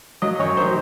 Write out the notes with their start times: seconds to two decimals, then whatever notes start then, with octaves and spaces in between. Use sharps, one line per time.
0.22 F#3 D#5
0.39 F#2 C#5
0.57 D#3 C5